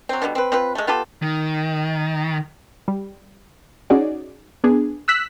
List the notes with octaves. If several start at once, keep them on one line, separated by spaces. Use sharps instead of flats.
F#3 C4
B2 D3 F3 G3
C4 B4
C4 F4 B4
G#3 A3
B3 F4 G4 A4
D#3
G3
C#4 D#4 F#4 G#4 D5
B3 D4 G#4
E6 F#6 B6